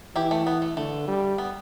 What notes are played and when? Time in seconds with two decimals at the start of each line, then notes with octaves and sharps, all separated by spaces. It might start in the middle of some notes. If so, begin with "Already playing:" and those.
0.16 E3 E4 G4
0.31 A3
0.47 B3
0.62 A3
0.77 D3 A3
1.07 G3
1.38 B3